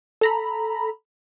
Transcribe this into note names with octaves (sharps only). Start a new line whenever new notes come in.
A4 A#5 B5